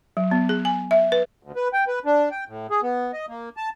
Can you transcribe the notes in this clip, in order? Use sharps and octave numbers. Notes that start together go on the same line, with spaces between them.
F#3
B3
G#4
G#5
E5
B4
D2
B4
G5
B4
D4
G5
A2
G#4
B3
D#5
A#3
A5